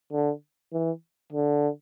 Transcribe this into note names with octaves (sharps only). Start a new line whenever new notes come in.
D3
E3
D3